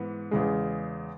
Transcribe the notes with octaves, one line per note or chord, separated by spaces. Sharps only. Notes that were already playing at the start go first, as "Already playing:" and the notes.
Already playing: G#2 E3 B3
E2 C#3 G#3